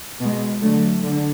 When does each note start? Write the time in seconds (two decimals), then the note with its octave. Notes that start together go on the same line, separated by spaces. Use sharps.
0.20 B2 G#3
0.61 D3 F#3 A3
1.02 D3